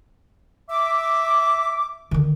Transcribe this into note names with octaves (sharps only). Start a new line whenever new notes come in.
E5 D6
D3 D#3